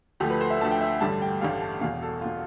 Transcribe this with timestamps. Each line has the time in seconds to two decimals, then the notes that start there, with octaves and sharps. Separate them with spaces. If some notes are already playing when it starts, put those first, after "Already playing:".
0.20 D2 D3 F3 A3 G4
0.30 B4
0.41 C5
0.50 E5
0.60 D2 D3 F3 A3 A5
0.71 G5
0.81 E5
1.01 A1 G2 D3 G3 A5
1.22 G5
1.41 A1 G2 D3 G3 F5
1.61 A5
1.81 E1 E2 B2 F5
2.02 A4
2.21 B2 F4